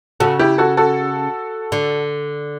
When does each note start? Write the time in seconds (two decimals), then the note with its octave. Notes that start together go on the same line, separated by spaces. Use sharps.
0.20 C#3 F#4 A4
0.39 E4 G4
0.58 F#4 A4
0.77 F#4 A4
1.72 D3